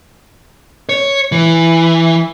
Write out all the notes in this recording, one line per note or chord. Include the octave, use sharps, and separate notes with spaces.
C#5
E3